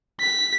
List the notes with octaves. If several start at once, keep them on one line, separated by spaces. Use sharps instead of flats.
B6